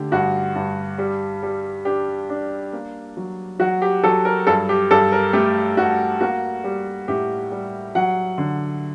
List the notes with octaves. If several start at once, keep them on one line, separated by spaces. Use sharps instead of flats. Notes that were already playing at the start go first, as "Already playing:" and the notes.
Already playing: D3 A3 G4
G2 F#4
G2
G3
G3
D4 G4
D4
A#3
F#3
F#3 F#4
G4
F#3 A4
A#4
G2 A4
G4
G2 A4
A#4
A3 G4
G2 F#4
A#3 F#4
G3
A2 G4
G3
F#3 F#5
D3